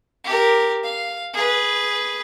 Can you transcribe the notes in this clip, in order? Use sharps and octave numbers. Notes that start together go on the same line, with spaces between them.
G4 A#4
F5
G#4 B4